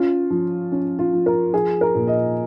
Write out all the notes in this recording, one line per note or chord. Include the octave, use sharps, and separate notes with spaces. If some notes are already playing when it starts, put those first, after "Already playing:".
Already playing: C#4 F4
F3
C#4
F4
F3
A#4
F3 G#4
A#4
A#2
D#5